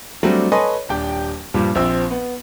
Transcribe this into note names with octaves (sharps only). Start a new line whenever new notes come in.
F#3 G3 A3 C4 D4
A4 B4 C#5 D#5 G#5 C6
D#1 D4 G4 G5
G2 A#2 F3 G3
A#1 F3 C4 E6
B3